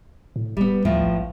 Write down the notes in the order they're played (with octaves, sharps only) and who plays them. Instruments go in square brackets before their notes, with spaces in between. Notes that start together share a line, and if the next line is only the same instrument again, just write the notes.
[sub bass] A2
[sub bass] E1 [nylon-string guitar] G3 B3
[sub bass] D2 [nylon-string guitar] A2 F3 F4
[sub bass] A#1